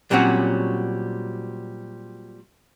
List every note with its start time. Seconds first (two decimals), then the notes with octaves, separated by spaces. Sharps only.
0.11 A#2 F#3 G3 C4 C#4 F#4